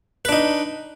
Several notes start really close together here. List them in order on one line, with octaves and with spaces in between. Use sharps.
B4 D4 D#4